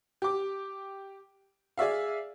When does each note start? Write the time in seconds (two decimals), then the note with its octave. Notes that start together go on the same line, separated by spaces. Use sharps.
0.22 G4 D6
1.77 G#4 D5 E5 F5